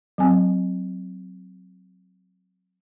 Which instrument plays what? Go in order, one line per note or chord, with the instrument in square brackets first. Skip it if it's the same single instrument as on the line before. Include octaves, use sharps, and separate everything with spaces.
[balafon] F#3 C4 G#5